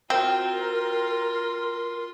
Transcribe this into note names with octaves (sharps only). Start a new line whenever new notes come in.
C4 F4 F#4 A#4 G5 C6